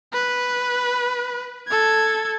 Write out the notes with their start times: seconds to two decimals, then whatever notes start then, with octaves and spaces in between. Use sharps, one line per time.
0.13 B4
1.68 A4 G#6